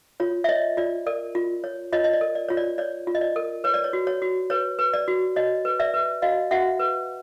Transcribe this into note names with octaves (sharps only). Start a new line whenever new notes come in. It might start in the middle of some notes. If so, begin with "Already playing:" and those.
F4 C#5
E5
C#5 D#5
F4 D5
A#4 D5
F4
C#5
F4 C#5 D#5
D#5
D5
A#4
D5
F4 C#5
D5
C#5 D5
F4
D#5
D5
A#4
B4 C#5
D5
C#5
F#4
C#5
F#4
B4 C#5
B4
D5
F#4
F#4 C#5 D#5
B4
D5 E5
B4
F#4 D#5 F5
F#4 E5 F#5
B4